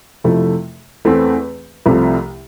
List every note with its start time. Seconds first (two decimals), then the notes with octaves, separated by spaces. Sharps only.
0.24 F2 C3 F3 A3 E4
1.05 E2 E3 A3 C4
1.86 C2 C3 F3 A3